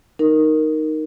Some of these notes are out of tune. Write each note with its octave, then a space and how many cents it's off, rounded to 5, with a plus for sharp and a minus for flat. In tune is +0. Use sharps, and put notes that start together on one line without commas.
D#4 +0 A#4 +0